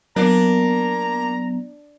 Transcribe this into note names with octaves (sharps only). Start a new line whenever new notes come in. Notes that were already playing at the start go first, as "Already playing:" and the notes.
F#3 A#3 B3 D4 A#5